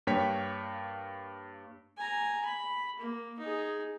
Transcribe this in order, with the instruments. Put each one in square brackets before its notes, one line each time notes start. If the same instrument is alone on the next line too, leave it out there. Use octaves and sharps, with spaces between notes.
[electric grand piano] G2 A#3 C#5 G5 B6
[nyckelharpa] G#5 A#5
B5
A#3
D#4 G#4